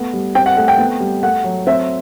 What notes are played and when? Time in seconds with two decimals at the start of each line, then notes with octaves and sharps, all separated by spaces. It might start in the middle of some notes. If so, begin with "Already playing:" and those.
Already playing: A3 B3
0.13 G3
0.35 C4 G5
0.46 F#5
0.57 A3 F#5
0.68 G5
0.78 B3
1.00 G3
1.23 A3 F#5
1.44 F#3
1.67 C4 E5